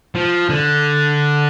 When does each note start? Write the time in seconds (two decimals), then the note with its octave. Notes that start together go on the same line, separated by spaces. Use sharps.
0.15 F3
0.49 D3